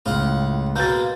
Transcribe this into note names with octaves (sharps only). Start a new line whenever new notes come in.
C#2 A2 F4 F#5
B2 G#3 A#3 G6 A6